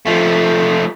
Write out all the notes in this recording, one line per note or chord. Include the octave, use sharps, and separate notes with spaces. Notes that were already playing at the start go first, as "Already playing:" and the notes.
F3 A3